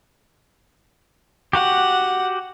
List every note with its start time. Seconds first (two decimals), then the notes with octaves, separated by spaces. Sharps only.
1.53 F#4 G4 F#5